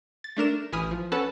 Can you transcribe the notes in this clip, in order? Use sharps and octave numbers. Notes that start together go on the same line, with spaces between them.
A6
A3 D4 A#4 E7
A1 E3 G#5 B5 D#6 F6
F3
C#4 A4 B4 F#5 B5